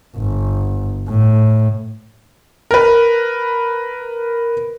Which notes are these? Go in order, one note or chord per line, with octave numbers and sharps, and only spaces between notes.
G1
A2
A#4 B4